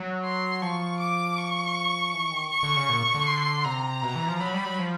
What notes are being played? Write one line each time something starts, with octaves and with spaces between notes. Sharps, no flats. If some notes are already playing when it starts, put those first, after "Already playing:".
Already playing: F#3
C6
F3 C#6
D6
C#6
E3
D#3
C#6
D3
C#3
A#2
D3
C6
C3 A#5
B2
E3
F3
F#3 B5
G3
F#3
F3